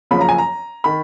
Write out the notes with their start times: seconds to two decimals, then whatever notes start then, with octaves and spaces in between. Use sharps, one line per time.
0.11 F#1 F#2 C#3 F3 B5
0.21 A#5
0.29 G#5
0.38 A#5
0.84 D#3 B5